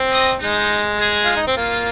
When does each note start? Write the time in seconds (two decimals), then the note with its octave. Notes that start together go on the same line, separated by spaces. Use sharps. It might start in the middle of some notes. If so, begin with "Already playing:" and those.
Already playing: C4
0.11 D#5
0.40 G#3 D#4
0.99 G#4
1.25 F4
1.36 D#4
1.47 C4
1.57 A#3 F4